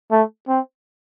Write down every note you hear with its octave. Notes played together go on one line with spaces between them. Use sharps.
A3
C4